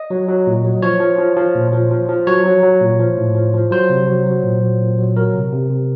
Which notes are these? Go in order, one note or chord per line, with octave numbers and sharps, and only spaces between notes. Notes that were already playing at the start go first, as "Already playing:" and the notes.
Already playing: D#5
F#3
F#3
A#2
F#3
F3 C#5
F3
F3
F3
A#2
F3
F3
F3
F#3 C#5
F#3
F#3
A#2
F3
A2
F3
F3
F#3 C5
C3
F#3
F#3
A#2
F#3
A#2
F#3
F#3 A#4
C3
C3
C3